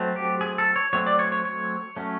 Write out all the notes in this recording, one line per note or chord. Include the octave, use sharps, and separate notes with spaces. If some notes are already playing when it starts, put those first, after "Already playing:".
Already playing: F#3 A3 C4
G4
G#4
A4
C#5
F#3 A3 C4 C#5
D5
C#5
C#5
C#5
F#3 A3 C#4